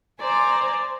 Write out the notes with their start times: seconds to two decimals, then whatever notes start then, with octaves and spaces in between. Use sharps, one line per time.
0.20 C5 D5 G#5 A#5